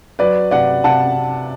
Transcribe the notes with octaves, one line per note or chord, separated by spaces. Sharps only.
F#3 B4 D5
C3 D5 F#5
C3 F#5 A5